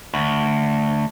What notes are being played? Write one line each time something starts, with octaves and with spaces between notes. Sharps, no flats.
D2